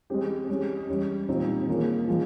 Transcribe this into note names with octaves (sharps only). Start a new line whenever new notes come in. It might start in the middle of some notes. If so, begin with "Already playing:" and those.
G#3 C4 G4
G#3 C#4 G4
G3 C#4 G4
A#2 G3 C4 D#4
D#3 A#3 C#4 F4 G#4
F3 G#3